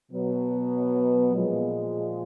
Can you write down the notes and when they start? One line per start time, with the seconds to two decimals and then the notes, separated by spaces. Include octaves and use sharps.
0.12 B2 F#3 B3
1.34 A#2 F3 G#3